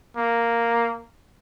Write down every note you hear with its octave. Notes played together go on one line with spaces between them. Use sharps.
A#3